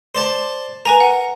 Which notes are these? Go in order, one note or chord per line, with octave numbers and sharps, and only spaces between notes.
C5 D5 A5
A#4 B4 G#5 A#5
F#5